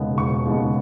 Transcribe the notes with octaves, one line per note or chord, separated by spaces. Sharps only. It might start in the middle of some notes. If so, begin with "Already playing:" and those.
Already playing: E1 D#2 C#3 G#3 B3
E1 C#6
D#2 C#3 G#3 B3